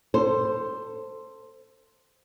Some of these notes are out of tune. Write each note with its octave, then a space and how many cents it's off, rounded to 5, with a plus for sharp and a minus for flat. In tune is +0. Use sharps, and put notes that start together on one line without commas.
A4 +20 C5 +0